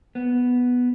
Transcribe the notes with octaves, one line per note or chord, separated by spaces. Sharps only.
B3